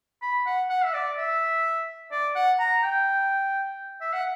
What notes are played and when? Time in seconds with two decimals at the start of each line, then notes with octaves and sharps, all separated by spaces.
0.22 B5
0.47 F#5
0.70 F#5
0.85 E5
0.94 D5
1.18 E5
2.12 D5
2.36 F#5
2.60 A#5
2.83 G5
4.01 E5
4.14 F#5